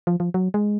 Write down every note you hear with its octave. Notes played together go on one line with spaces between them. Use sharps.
F3
F3
F#3
G#3